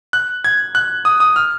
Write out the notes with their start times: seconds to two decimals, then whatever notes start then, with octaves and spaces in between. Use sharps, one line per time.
0.13 F#6
0.44 G#6
0.75 F#6
1.05 D#6
1.20 D#6
1.36 F6